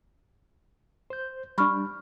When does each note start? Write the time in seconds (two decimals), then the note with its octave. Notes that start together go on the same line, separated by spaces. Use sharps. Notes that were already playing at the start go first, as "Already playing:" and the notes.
1.10 C5 G6
1.58 G3 D4 B5 C#6 F6